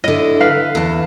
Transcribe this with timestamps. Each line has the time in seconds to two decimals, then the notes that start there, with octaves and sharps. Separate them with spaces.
0.04 D3 E4 D#5
0.40 B4 F5
0.75 E2 A5